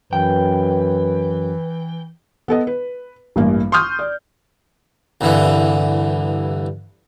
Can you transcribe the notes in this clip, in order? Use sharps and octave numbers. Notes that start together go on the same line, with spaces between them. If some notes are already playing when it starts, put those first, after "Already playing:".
F#2 E3 B4 G5
B3 A4 D#5
B4
A1 G2 A#3
C6 C#6 D#6 F6 G6
D5
C2 G2 D3 E3